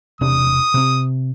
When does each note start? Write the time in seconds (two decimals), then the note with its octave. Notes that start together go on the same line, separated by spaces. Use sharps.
0.21 E1 C3 D4 D#6
0.74 C3 C4